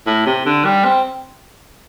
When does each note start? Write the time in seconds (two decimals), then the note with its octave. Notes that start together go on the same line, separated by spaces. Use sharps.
0.06 A2
0.26 C3
0.46 D3
0.65 G3
0.85 C4